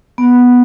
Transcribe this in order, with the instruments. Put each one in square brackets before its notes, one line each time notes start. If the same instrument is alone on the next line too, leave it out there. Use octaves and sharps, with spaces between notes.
[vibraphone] B3